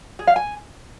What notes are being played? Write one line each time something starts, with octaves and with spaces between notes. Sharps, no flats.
G#4
F5
G#5